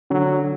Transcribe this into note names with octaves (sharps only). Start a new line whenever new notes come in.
D3 F#3